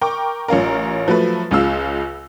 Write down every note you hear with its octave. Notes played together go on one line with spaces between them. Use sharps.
A#4 G5 C#6 D6
A1 C#4 F4 A#4
F3 F#3 A3 B4
C#2 C#3 G#3 F4 E6